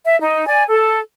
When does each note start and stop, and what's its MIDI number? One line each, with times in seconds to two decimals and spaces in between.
0.05 0.17 76
0.21 0.45 63
0.47 0.62 74
0.47 0.62 80
0.69 1.00 69